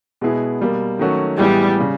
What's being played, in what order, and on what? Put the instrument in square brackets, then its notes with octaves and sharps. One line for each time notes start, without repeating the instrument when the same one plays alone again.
[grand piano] B2 G#3 B3 E4 G#4
B2 G3 A#3
D#3 F#3 A3 C#4 F#4
[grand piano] A2 E3 G#3 B3 [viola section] G3
[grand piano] C#3